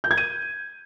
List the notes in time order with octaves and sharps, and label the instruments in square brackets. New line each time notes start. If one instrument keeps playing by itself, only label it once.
[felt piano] G6
G#6
D#7